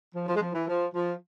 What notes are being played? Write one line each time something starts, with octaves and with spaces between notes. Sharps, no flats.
F3
F3
G#3
F3
E3
F3
F3